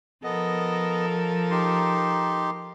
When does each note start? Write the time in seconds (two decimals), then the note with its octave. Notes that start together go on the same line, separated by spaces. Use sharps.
0.24 F3 B3 A4 A#4 D#5
1.51 D#4 G4 C6